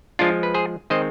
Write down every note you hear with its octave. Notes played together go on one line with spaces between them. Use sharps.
F3 G#3 D4 F4
B4
G#4 C5
D#3 G#3 C4 C5 D#5